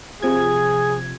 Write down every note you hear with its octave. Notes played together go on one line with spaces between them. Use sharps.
C3 F3 G#4 G#6